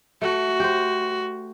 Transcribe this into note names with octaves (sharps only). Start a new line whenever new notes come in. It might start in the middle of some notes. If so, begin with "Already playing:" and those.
A3 F#4
G4 C5